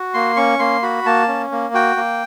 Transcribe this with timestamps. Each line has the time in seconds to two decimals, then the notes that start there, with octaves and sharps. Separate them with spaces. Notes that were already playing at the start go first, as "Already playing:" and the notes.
Already playing: F#4
0.14 A#3 C6
0.36 C#4 C#6
0.59 A#3 C6
0.82 F#4 B5
1.06 A#3 A5
1.28 C#4
1.52 A#3
1.74 F#4 G5
1.97 A#3